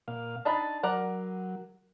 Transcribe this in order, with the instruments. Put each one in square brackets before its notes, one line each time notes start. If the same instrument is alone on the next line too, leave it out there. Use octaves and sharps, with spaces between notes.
[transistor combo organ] A#2 F5
[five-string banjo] D4 D#4 B5 [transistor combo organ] A5
[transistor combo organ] F#3 [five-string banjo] A#4 D5 F#5